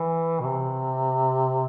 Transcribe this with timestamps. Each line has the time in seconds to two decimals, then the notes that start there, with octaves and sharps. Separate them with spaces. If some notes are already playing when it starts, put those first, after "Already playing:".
Already playing: E3
0.40 B2
0.46 C3